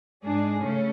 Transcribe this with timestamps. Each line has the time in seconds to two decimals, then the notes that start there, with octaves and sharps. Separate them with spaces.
0.23 G#2 G#3 D4 G#4
0.62 C#3 A3 C#4